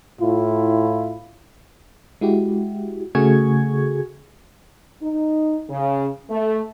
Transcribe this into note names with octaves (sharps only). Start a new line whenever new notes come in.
A2 E4 F4
G#3 E4 F#4 G4
C#3 A3 F#4 G#4 C#6 G#6
D#4
C#3
A3